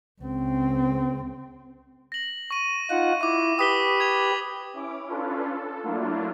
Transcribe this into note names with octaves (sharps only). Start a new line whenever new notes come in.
C#2 C4
A#6 F#7
C#6 D#7
D#4 F4 F#5
E4 C#6 D6
G4 B4 D#6 B6 G7
G#6 F7
C#4 E4 D6
C#4 D4 F4 A4 B4
A4
F#3 A3 A#3 D4 E4 F4